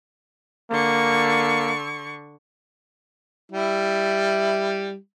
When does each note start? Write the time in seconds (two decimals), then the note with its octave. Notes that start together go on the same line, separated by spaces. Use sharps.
0.71 D3 A#3 C#6
3.52 G3 E4